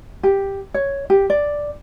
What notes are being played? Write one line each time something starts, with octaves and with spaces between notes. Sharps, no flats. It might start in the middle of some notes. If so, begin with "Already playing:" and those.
G4
C#5
G4
D5